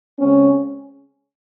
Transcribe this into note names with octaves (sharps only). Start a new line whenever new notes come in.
C#3 G#3 C4 C#4